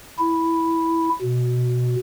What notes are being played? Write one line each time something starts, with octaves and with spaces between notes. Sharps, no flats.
E4
B2